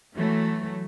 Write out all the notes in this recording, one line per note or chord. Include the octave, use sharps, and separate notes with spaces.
E3 F#3 A3